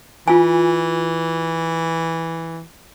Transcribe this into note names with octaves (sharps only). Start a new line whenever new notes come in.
E3 F4 G#5